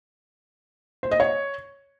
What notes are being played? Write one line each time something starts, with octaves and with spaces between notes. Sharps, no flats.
C5
D#5
C#5